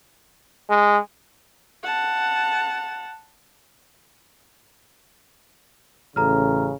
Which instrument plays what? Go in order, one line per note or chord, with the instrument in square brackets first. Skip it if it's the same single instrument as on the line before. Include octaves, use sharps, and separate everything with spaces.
[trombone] G#3
[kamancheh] F#5 A5
[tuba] A1 [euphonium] C#3 [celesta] A4 A#5 F6